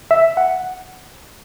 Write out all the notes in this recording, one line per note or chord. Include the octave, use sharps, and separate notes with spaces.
E5
F#5